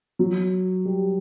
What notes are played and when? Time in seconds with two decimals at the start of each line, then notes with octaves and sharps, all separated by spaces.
0.19 F#3
0.85 G3